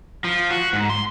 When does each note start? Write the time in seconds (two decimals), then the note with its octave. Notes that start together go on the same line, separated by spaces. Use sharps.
0.24 F3
0.51 F#4
0.73 G#2
0.90 C6